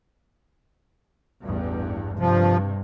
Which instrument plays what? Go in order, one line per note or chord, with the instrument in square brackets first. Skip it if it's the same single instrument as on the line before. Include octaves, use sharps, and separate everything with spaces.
[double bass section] A1 E2 G2
[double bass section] G2 C3 [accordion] F3